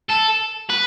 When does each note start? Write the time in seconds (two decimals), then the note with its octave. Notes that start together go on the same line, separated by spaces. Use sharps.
0.09 A4
0.70 B4